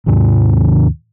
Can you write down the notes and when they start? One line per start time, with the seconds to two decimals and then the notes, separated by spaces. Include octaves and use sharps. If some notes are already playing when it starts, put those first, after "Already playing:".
0.06 D#2 G#2 C3 D#3